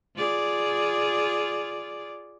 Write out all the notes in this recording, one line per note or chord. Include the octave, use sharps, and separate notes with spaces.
F4 G#4 D5